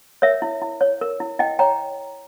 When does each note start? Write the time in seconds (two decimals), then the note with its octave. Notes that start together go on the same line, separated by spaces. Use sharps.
0.22 A#4 C#5 E5
0.42 E4
0.62 E4
0.81 C#5
1.01 A#4
1.20 E4
1.39 E4 D#5 G5
1.59 C#5 G5 A#5